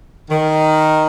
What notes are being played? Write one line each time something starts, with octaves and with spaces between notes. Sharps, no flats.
D#3